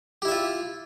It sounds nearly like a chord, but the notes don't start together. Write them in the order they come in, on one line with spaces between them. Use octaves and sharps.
G4 E4 E5 F4